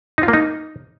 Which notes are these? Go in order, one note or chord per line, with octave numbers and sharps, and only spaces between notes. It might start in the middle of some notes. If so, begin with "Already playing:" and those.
D#4
F4
A#3
D#4